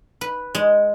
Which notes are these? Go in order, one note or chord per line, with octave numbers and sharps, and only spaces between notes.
B4
G#3